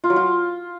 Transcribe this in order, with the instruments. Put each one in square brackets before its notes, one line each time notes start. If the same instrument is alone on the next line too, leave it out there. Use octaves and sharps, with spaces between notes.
[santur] F4
F#3
F4